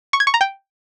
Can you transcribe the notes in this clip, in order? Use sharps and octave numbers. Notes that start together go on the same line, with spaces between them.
C#6
G#6
C#6
A#5
G5